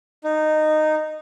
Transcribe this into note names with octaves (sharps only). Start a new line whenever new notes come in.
D#4